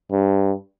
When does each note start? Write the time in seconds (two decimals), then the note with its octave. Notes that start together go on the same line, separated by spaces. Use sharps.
0.12 G2